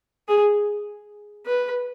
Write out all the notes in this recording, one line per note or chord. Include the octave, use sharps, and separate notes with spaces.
G#4
B4